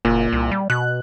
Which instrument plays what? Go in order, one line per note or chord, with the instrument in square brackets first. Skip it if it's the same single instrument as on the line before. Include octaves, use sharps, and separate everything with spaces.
[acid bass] F#1 [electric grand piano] A#2
[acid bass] C2
G3
[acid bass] B2 [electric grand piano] F#6